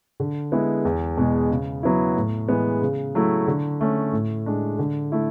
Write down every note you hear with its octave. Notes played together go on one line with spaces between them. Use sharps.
D3
G#3 B3 E4
E2
B2 G#3
C#3
F#3 B3 E4
A2
E3 G#3 B3
C#3
F#3 A3 E4
D3
A3 C#4
A2
G#3 D4
D3
A3 E4